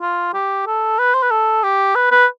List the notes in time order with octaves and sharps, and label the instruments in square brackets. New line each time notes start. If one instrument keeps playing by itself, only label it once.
[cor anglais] F4
G4
A4
B4
C5
B4
A4
G4
B4
B4